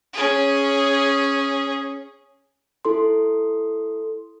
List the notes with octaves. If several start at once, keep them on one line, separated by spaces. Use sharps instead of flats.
C#4 G#4
E4 A4 C6